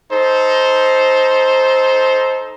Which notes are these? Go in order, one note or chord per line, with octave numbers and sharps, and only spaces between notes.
D#4 A4 C5